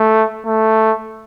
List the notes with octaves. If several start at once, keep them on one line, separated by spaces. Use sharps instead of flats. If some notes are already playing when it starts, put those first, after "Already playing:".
Already playing: A3
A3